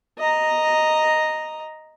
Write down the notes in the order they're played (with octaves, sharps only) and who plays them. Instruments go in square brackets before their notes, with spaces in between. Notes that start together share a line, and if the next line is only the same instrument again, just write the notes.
[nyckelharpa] D#5 A#5